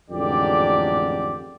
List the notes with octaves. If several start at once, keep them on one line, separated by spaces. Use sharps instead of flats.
A1 F2 G#2 D3 G4 D5